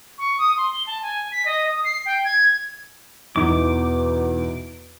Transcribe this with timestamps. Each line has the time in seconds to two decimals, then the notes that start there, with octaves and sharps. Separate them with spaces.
0.18 C#6
0.38 D#6
0.57 C6
0.73 G7
0.87 A5
1.02 G#5
1.32 B6
1.46 D#5
1.66 D#6
1.84 C7
2.06 G5
2.24 G#6
3.36 E2 B2 E3 D#4 D6